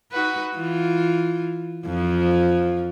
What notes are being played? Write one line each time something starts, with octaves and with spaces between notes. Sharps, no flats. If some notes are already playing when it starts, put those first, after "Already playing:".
D#4 F#4 B4
E3 F4
F2 F3